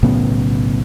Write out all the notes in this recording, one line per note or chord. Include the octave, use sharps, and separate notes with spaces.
B1 A2 C#3 B3